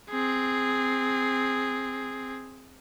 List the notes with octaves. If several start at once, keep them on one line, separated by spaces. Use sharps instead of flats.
C4 G#4